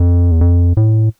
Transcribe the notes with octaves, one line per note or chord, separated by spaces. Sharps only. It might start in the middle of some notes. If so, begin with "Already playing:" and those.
Already playing: F2
E2
F2
A2